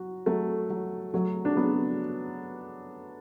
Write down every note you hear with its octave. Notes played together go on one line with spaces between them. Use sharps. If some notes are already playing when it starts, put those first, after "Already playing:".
Already playing: F#3 F#4
F#3 A3
F#3
F#3 A3
D4
F#3 B3